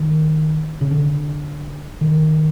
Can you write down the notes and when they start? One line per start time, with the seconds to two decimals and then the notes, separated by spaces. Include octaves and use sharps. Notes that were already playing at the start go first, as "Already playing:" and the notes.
Already playing: D#3
0.81 C#3
0.91 D3
2.01 D#3